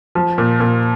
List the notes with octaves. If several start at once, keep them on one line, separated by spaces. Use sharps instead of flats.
F3
A#2
A#2